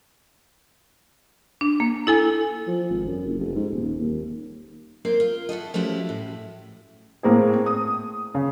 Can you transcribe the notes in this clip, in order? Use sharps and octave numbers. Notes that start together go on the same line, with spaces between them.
D4
A#3
E4 A4 G#5
F3
G#1
F#2
F#1
F1
G#2
D#1
D#2
A#3 C4 C5
F4
E4 F#4 A4 D#5
F3 A3 C#4 E4 F#4 G4
A2
A2 A#3 C4 G#4
D#6
C#3